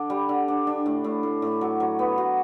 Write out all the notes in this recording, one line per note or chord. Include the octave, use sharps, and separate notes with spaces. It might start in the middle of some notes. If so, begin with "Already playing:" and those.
Already playing: D3 D4
G3
D3
D4
D4
A2
A2
A2
A2
F#3
F#3
B3
F#4